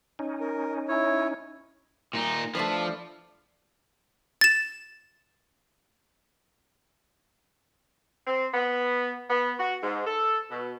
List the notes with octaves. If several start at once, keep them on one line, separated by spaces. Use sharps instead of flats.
C#4 D#4
A#4
E4 C#5
A#2 D#4
F3 A3 D4 B4
A6 E7
C4
B3
B3
F#4
G#2
A4
B2